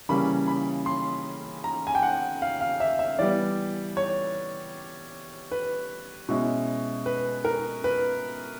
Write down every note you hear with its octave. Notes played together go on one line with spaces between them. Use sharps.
C#3 E3 G3 A#3 C#4 B5
B5
C6
A#5
G#5
G5
F#5
F5
F5
E5
E5
E3 G3 B3 D5
C#5
B4
B2 G#3 C#4 E4
B4
A#4
B4